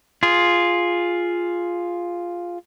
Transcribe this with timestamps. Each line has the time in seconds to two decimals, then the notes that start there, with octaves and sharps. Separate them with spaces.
0.23 F4 G#4